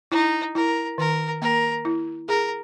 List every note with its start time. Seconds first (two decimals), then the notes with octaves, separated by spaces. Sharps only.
0.12 D#4 E4
0.55 E4 A#4
0.98 D#3 A#4
1.42 A#3 A#4
1.85 E4
2.29 G#4 A#4